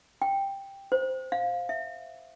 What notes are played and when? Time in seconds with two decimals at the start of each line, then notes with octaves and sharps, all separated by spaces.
0.22 G5
0.92 C5
1.32 F5
1.69 E5